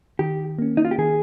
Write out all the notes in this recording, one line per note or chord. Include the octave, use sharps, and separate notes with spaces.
D#3 G4
A#3 C#4
D#4
F4
G4
D#3 G#4